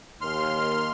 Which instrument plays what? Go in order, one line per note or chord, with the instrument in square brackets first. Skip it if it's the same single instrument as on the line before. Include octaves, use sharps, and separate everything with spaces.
[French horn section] D#2 [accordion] C6 F6